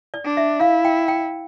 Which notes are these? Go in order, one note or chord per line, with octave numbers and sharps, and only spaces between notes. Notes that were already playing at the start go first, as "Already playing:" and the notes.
D5
D4
E5
E4 F5
G5
G5